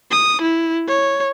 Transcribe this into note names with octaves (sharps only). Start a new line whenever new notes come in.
D#6
E4
C#5